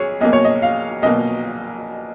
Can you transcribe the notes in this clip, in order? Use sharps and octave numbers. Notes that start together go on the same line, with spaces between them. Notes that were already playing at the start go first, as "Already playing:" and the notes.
Already playing: B1 G#4 C#5
B1 B2 A#3 D#5
C#5
D#5
F5
B1 B2 A#3 D#5